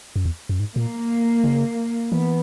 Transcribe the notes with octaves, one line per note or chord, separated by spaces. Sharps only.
F#2
E2
F#2
G#2
A#2 A#3
C#3
E3 B3